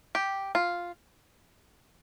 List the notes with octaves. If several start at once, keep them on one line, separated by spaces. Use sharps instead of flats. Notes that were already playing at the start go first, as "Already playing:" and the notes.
G4
F4